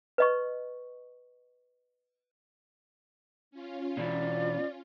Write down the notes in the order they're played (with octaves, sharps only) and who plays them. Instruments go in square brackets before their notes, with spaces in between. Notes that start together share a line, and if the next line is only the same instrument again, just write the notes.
[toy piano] B4 D#5 C#6
[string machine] C#4 F4
[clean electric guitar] B2 E3 [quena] D5